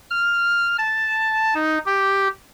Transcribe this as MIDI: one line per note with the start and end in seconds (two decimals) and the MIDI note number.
0.10 0.77 89
0.78 1.54 81
1.54 1.78 63
1.86 2.28 67